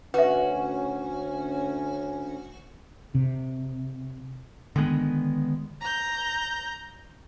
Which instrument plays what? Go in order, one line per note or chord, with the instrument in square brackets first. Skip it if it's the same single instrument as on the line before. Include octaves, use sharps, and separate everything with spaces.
[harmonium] D2 C#4 [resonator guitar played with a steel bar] F#4 [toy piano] B4 E5
[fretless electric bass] C3
[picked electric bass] D3 D#3 G#3 B3
[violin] A#5 G6